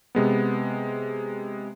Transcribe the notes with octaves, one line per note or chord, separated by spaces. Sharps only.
C3 G#3 B3